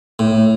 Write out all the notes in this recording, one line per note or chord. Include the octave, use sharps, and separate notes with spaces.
A2